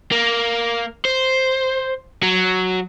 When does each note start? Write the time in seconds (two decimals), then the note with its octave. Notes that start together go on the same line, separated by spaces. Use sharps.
0.12 A#3
1.05 C5
2.22 F#3